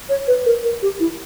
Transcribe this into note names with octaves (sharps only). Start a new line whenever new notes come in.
C#5
B4
A#4
A#4
G4
E4